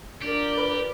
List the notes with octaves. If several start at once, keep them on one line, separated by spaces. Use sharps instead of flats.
D4 F4 G4 A#4 D5
B4